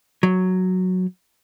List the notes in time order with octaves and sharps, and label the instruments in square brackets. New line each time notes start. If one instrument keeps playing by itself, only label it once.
[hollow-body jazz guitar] F#3